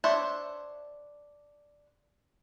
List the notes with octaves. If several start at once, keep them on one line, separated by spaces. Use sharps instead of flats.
D4 C5 C#5 E5